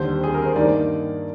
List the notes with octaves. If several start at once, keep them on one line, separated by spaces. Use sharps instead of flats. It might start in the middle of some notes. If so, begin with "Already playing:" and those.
Already playing: D#2 D3 G3 C5
G#4
A#4
C5
G2 D#3 A#3 D#4 D5